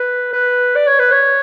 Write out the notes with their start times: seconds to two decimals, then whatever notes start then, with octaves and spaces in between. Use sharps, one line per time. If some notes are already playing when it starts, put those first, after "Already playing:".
Already playing: B4
0.33 B4
0.75 D5
0.87 C#5
0.99 B4
1.12 C#5